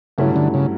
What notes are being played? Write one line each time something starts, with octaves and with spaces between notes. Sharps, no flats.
G2 C#3 F#3 A3 C#4 E4
D3
C#3